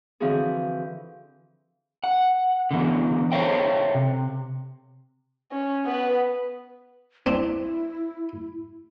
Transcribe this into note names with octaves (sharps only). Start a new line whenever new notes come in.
D3 E3 F3 C4 F#4 G#4
F#5
D3 E3 B3
A4 C5 C#5 E5 F5 G5
C3
C#4
B3 B4
C4 D4 E4